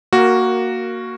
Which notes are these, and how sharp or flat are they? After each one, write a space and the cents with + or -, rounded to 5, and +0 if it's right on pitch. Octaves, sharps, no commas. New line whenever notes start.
A#3 +0 F#4 +0 A#4 -15